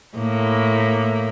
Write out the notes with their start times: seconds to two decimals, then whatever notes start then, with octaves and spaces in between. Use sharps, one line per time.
0.17 A2 A#3